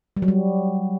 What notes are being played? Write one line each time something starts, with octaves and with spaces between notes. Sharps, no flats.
G3
F#3
G3